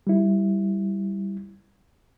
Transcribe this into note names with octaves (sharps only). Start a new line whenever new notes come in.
G3 E4